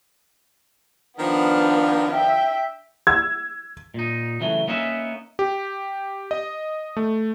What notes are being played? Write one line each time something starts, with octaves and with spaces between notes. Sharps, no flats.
D#3 F3 B3 D4
E5 G5
E6 G#6
A#2 D#4
C#3 E3 F#3 A3
A#3 B3 C#4 D#4 E5
G4
D#5
A3